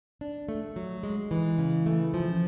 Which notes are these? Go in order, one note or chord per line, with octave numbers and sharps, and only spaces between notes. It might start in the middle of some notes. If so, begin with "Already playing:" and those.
D4
A3
F#3
G#3
E3
C#3
A3
F3